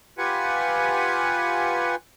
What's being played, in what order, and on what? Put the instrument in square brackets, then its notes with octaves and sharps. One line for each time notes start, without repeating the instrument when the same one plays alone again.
[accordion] F4 G4 B4 F#5 G#5